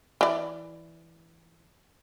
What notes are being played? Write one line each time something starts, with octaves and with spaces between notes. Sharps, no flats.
E3 D5